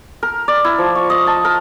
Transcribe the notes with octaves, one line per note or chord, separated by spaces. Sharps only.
A#4
D5
E4
F3
C#6
D#5
A5
A#4